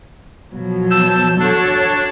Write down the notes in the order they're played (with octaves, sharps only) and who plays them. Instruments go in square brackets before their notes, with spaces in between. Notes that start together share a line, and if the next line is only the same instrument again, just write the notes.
[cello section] B2 F3 F#3
[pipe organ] A5 E6 G6
[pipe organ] D4 [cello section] F#4 A4 C#5